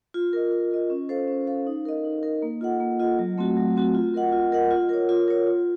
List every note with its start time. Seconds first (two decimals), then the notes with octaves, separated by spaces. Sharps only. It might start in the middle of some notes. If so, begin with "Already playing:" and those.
0.14 F4
0.33 A#4 D#5
0.52 F4
0.71 A#4 D#5
0.90 C#4
1.09 A4 C5 F5
1.28 C#4
1.47 A4 C5 F5
1.67 D#4
1.85 A#4 D#5
2.04 D#4
2.23 A#4 D#5
2.42 A#3
2.61 F4 A4 D#5 F#5
2.80 A#3
3.00 F4 A4 D#5 F#5
3.19 F#3
3.38 A3 C4 F#4
3.57 F#3
3.76 A3 C4 F#4
3.95 F4
4.14 A#4 D#5 F#5
4.32 F4
4.52 A#4 D#5 F#5
4.71 F4
4.89 A#4 C#5
5.09 F4
5.28 A#4 C#5
5.47 F4